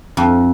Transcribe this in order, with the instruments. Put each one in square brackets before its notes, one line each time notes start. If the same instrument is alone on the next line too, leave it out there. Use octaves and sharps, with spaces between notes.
[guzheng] F2